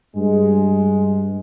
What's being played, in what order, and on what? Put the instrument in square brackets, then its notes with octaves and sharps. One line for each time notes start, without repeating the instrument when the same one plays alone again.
[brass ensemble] G2 G#3